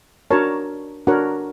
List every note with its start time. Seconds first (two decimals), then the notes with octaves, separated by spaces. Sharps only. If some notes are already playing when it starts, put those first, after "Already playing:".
0.31 D4 F#4 A#4 C#5 A5
1.07 D4 F#4 A#4 C#5 F#5